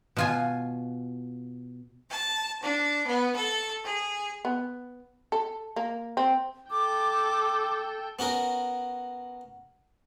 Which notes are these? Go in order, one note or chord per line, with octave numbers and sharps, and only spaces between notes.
B2 F4 G#5
A5
D4
B3
A4
G#4
B3
A4
A#3
C4
A4 G5 D6
B3 C#4 F#4 A#4